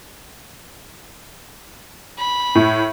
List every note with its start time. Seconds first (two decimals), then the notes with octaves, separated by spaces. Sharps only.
2.18 B5
2.55 A2